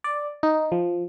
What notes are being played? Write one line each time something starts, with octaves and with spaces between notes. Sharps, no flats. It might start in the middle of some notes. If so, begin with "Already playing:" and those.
D5
D#4
F3